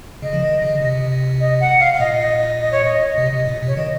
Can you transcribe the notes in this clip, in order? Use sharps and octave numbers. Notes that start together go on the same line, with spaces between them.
C#3 D#5
F3
D#3
C#3
C3
D#5
F#5
F5
F5
A#2 D#5
D#5
D#5
D#5
C#5
D#5
C3
C3
A#2
C3 C#5
D#3 D#5